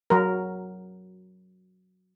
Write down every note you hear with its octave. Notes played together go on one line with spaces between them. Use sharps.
F#3 A#4